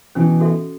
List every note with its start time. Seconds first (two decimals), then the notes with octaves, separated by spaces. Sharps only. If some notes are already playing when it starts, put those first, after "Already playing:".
0.15 B2 E3 C#4
0.40 F#4 A4 E5